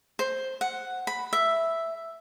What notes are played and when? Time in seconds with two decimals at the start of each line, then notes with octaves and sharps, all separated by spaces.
0.19 C5
0.61 F#5
1.07 B5
1.33 E5